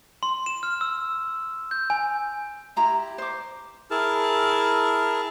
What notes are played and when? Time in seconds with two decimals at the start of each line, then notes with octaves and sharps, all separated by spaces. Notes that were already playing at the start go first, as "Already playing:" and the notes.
0.23 C6
0.46 E7
0.63 F6
0.81 E6
1.71 G6
1.90 G#5
2.76 E4 G4 A#5 C6
3.18 C5 D6
3.91 E4 G#4 A#4 A5 F6